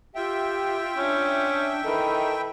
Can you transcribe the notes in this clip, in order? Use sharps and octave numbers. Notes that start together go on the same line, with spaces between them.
F4 G4 E5 G5
C#4 D4
D#3 E3 A4 B5